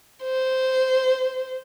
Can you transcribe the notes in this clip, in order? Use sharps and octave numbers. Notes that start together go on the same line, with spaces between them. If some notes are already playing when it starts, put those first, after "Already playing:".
C5